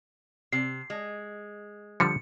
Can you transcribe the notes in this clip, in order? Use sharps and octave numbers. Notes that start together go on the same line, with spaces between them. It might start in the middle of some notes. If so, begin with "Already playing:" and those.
C3 C7
G#3
D3 F3 G3 C#7